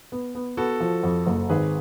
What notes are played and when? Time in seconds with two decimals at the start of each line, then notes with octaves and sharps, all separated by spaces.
0.12 B3
0.35 B3
0.57 B3 F#4 A4
0.80 F3
1.03 F2
1.26 F#1
1.49 G#1 G#4 B4